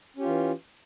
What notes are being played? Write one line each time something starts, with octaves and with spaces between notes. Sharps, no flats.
E3 C#4 F4 G4